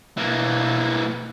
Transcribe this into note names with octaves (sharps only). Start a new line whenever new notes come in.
B2 E3 A#3